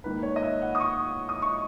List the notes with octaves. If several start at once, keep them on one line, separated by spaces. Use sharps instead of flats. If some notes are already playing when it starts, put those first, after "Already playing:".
G#2 D#3 A#3 B4
C#5
D#5
E5
F#5
D#6
C#6
D#6
C#6